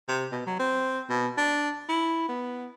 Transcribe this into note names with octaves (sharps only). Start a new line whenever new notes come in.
C3
B2
F#3
C4
B2
D4
E4
B3